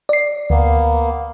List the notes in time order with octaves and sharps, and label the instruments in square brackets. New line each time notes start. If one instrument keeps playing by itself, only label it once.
[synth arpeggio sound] D5 C7
[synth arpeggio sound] D2 [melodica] A#3 B3